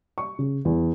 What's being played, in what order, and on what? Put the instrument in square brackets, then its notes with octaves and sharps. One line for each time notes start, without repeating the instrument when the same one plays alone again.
[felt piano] C#6
C#3
E2